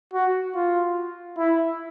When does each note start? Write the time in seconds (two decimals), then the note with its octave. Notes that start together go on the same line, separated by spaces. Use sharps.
0.14 F#4
0.55 F4
1.38 E4